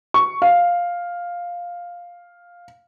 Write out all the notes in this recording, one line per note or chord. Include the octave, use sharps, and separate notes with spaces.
C#6
F5